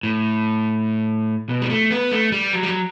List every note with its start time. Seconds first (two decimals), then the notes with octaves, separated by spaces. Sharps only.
0.03 A2
1.49 B2
1.61 G3
1.70 A3
1.90 B3
2.12 A3
2.32 G3
2.53 F#3
2.63 G3
2.69 F#3